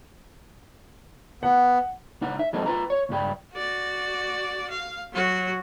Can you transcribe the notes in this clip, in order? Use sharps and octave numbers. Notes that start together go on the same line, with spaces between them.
B3 F#5
C#2 D#4 F#5
E5
F3 G#3 C4 D#4 F#4 A4
F4 B4 A#5
C#5
C#2 G2 G3 G5
F#4 D5
F5
F#3 F#4